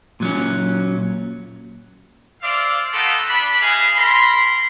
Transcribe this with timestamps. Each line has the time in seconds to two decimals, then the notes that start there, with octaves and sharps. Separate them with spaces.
0.20 A#2 F#3 C#4
2.42 C5 D5 E5 F5
2.93 A3 B3 D#4 F4 G4 A4
3.29 D4 B5
3.61 D#4 E4 F#4 G#4 F5 G#5
3.96 A#4 B5 C6